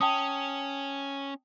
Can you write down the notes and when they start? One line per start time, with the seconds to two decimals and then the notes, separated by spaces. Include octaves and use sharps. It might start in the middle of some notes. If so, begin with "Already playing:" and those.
0.01 C#4 G5 A5 D#6